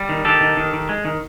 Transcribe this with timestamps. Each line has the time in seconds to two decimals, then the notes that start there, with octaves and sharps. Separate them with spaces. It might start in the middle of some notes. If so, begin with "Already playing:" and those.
Already playing: G3
0.09 D#3
0.25 D#3 G4 A4
0.41 D#3
0.57 D#3
0.73 D#3
0.89 G#3
1.05 D#3